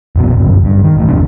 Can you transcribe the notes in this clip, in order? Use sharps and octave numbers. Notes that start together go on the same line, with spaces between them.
F1 A#1 B2
D1 G1 F#2
G2
D#3
A1 A2
E1 C3 F3 D4